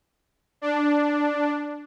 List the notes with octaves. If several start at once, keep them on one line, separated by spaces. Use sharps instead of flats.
D4